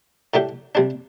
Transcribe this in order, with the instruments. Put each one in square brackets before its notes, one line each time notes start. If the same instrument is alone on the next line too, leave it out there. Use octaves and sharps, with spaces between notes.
[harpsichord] A2 A3 D4 G4
C3 G3 D4